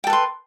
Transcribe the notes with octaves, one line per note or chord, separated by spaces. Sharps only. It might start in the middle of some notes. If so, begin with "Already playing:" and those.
A4 B4 G5 C6